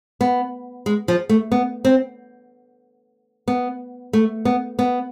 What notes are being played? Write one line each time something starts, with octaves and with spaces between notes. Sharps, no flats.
B3
G#3
F3
A3
B3
C4
B3
A3
B3
B3